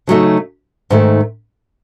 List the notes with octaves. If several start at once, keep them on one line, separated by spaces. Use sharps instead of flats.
C#3 F#3 A3 D#4
G#2 D#3 A3